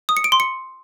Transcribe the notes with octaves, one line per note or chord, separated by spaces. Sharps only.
D#6
C#7
D7
C6
C#7